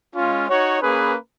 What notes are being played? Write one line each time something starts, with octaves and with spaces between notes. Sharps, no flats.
G#3 C#4 F4
D#4 F#4 C#5
A#3 C#4 G#4 B4